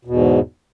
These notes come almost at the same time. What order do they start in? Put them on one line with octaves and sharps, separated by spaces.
B2 E2 G#2